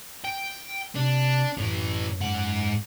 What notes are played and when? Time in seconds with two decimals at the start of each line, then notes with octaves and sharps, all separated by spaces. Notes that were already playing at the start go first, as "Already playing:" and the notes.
0.24 G5
0.95 C3 D4
1.58 F#2 A2 E3
2.21 G#2 F#5